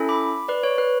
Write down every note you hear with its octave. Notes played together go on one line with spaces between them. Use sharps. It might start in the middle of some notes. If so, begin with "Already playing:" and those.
Already playing: C#4 E4 A4
B5 D6
B4 D5
C#5
B4